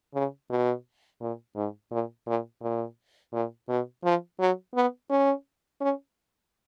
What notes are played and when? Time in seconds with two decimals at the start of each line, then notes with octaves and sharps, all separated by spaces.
0.14 C#3
0.50 B2
1.20 A#2
1.55 G#2
1.91 A#2
2.27 A#2
2.62 A#2
3.33 A#2
3.69 B2
4.04 F3
4.39 F#3
4.75 B3
5.10 C#4
5.81 C#4